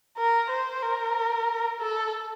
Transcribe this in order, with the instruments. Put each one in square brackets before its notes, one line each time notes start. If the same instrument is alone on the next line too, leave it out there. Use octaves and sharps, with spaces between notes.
[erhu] A#4
C5
A#4
A4